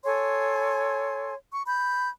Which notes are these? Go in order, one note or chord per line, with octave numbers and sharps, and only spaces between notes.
A4 C#5 G#5 C6
C#6
B5 G6